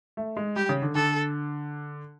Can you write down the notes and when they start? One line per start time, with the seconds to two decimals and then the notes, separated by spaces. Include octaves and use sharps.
0.17 A3
0.37 G#3
0.56 G3 G4
0.69 C#3
0.82 D3
0.95 D3 A4